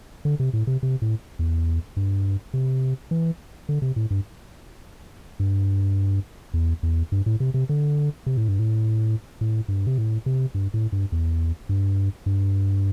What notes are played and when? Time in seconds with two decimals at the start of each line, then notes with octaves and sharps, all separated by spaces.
0.25 D3
0.40 C3
0.53 A2
0.67 C3
0.83 C3
1.02 A2
1.39 E2
1.97 G2
2.54 C3
3.11 E3
3.69 D3
3.82 C3
3.96 A2
4.10 G2
5.40 G2
6.54 E2
6.83 E2
7.12 G2
7.26 A2
7.40 C3
7.54 C3
7.69 D3
8.26 C3
8.37 A2
8.48 G2
8.59 A2
9.41 A2
9.68 G2
9.87 C3
9.98 A2
10.26 C3
10.54 G2
10.74 A2
10.92 G2
11.12 E2
11.69 G2
12.26 G2